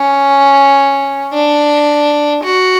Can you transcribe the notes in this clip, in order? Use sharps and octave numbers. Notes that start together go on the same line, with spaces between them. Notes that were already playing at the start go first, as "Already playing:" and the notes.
Already playing: C#4
D4
F#4